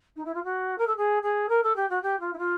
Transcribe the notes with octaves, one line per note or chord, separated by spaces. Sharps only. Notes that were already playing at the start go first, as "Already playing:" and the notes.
D#4
E4
F4
F#4
A#4
A4
G#4
G#4
A#4
A4
G4
F#4
G4
F4
E4
F4